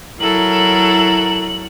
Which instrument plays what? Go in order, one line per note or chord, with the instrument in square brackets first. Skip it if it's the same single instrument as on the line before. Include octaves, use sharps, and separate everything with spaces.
[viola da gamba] F#3 E4 [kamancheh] A4 A#4 [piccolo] F#7